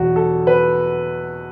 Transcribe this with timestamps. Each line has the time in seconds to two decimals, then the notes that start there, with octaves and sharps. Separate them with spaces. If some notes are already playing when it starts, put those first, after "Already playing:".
Already playing: E2 B2 F#3 F#4
0.16 A4
0.47 B4